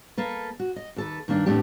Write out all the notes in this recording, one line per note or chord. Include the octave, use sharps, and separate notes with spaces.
A#3 A4 B4
F#4
D#5
D#2 A4 B4
G2 D#3 A#3 D4
E2 A2 A3 C4 D4 G4